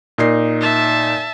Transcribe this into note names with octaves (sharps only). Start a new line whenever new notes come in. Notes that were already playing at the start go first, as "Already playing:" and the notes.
A#2 D#4 C7
E5 A5